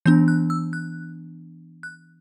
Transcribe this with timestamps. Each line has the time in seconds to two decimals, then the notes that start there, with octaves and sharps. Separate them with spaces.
0.05 E3 B3 D4 G6
0.28 F#6
0.50 E6
0.73 F#6
1.83 F#6